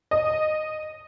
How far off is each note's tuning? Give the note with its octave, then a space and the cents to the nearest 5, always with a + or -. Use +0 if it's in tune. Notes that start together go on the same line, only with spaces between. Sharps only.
D#5 -10